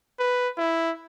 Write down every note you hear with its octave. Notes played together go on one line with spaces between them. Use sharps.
B4
E4